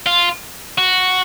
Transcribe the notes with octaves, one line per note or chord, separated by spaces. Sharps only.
F4
F#4